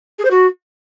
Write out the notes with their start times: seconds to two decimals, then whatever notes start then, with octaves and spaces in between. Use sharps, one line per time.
0.18 G#4
0.24 C5
0.30 F#4